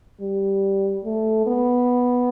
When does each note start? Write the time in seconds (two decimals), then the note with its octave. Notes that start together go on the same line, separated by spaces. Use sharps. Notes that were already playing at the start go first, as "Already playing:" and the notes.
0.20 G3
1.04 A3
1.46 B3